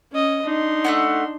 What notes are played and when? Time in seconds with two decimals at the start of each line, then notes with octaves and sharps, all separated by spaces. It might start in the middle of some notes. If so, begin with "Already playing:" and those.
0.12 C#4 D#5
0.45 D4 D#4 C6
0.85 A3 A#3 F#5